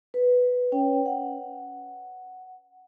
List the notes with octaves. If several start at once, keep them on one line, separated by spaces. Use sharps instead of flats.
B4
C#4 C#5 G5
F#5